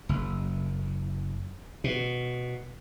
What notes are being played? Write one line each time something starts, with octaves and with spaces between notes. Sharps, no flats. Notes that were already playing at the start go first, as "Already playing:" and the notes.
F#1
B2